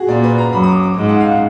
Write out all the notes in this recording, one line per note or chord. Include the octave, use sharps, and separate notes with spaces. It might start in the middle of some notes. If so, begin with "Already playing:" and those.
Already playing: F#4 G#4
A#2 D5
B4
A#5
F#2 B5
D#6
D6
D6
G#2 D6
F#5
F5
F#5